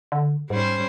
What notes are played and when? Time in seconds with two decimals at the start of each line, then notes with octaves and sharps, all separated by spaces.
0.12 D3
0.50 G#2 G3 C#4 C5